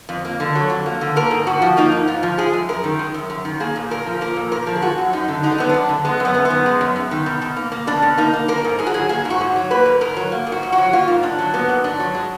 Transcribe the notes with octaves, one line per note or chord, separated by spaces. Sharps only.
F2
A#3
D3
F#3
F2
A#3
D3
A#3 A#4
G#2
G#2 F#4
F3
A#3 D#4
G#2
G#2 F4
F3
G#3 G#4
F#2
F#2 A#4
D#3
G#3
F#2
F#2
D#3
A#3 G#4
A#2
A#2 A#4
F3
A#3 A#4
A#2
A#2 A#4
F3
G#4
G#3 F#4
F#2
F#2 D#4
D3
G#3 D#4
D4
F#2 B3
F#2 D4
D3
G#3 B3
F#2
B3
F#2
B3
D#3
G#3
F#2
F#2
D#3
B2
B2
A#3
A#3
B2 D4
B2
A#3 D#4
A#3
A#3 A#4
G#2
G#2 G#4
F#4
F#3 G#4
A#3 G#4
G#2
F#4
G#2
F#3
A#3 B4
G#2
G#2 A#4
F#3
A#3
G#2
F#4
G#2
F#4
F#3
A#3 F4
G#2
G#2 D4
F#3
A#3 B3
G#2
G#2 D4
F#3
G#3